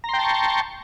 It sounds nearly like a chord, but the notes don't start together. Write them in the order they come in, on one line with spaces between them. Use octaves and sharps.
A#5 C6 G5 A5 C#6